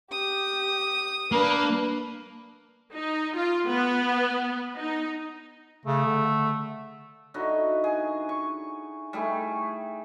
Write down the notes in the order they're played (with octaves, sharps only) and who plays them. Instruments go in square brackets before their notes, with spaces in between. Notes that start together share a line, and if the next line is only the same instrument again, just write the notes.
[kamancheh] G4 [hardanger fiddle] D#6
[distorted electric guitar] A#3 [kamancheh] D4 [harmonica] B4
[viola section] D#4
F4
B3
D#4
[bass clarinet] C#3 [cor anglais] A3
[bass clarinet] D3
[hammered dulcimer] D3 D#4 E4 F#4
G#4
C#6
G3 A3 E4 G#4